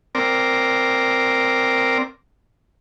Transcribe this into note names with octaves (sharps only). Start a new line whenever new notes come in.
C4 A#4 D5